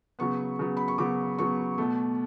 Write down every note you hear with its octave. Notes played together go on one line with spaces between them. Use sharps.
C#3 F#3 B3 C#6
C#3 F#3 B3
B5
C#6
C#3 F#3 B3 D6
C#3 F#3 B3 C#6
B2 A3